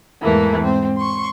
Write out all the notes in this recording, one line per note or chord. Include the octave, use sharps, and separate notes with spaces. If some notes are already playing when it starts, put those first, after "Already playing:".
E2 G#2 E3 A3 A#3
G#2 C4
C6 C#6